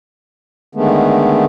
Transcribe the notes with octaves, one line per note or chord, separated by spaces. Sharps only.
D3 D#3 G#3 A3 B3